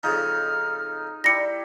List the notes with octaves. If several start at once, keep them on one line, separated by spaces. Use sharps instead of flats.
F2 C#3 F3 D#4 F6
G3 E4 G4 A#6 C#7